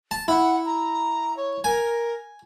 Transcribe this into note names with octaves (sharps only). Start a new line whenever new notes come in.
A5
E4 F#5
A#5
C#5
A#4 G#5